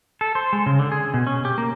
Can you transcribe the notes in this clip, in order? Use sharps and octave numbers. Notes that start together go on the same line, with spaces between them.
A4
C5
G#3
C#3
D3
G#4
B2
C#4
G4
A#3